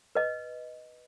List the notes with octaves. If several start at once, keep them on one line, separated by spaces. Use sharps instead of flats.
B4 D#5